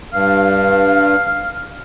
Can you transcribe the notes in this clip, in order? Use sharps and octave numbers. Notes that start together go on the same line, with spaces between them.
G2 F5